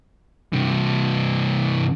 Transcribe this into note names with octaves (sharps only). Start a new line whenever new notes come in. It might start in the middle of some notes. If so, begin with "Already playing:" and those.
G2 C3